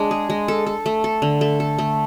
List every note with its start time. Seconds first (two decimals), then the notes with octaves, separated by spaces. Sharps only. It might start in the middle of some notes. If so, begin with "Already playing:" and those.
Already playing: G#3 D4
0.11 G#4
0.30 G#3
0.48 A4
0.66 A4
0.86 A3
1.04 A4
1.22 D3
1.41 A3
1.60 A4
1.79 A3